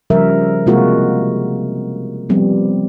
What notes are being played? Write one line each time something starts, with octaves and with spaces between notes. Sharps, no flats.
C#3 F3 G3 A#4 E5
C3 G#3 A#3 F4 F#4 A#4
F3 G3 B3 C4